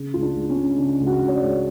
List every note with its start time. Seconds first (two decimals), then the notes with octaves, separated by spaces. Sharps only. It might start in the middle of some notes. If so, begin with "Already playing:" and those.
Already playing: C#3
0.14 C#2 F4
0.22 D4
0.35 C#2
0.49 C#4
0.56 G#3
0.78 C#3 D4
1.00 C#2
1.07 F#4
1.21 C#2
1.28 C#5
1.35 D5
1.42 C#2